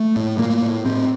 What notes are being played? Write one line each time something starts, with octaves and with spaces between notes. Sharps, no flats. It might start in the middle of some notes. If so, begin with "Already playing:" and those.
Already playing: A3
A2
A2 A#3
A2
A2 C4